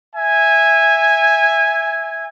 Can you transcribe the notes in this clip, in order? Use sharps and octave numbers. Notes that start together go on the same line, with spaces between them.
E5 G#5